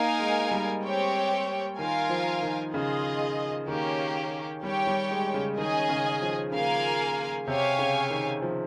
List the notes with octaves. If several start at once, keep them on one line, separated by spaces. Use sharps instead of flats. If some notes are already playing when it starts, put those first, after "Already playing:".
Already playing: A#3 D#4 A#4 F5 G#5
G#3
G3
C4 G4 C#5 G5
D#3 F4 A#4 F5 G#5
F3
D#3
C#3 F4 G#4 D#5
D#3 A#3 C#4 G4
G3 G4 C#5 G5
G3
G#3
C#3
D#3 C#4 G#4 D#5 G#5
C#3
F3
C#3 A#3 F4 A#4 F5 G#5
C3 G4 C#5 F5 G#5
C#3
D#3
F3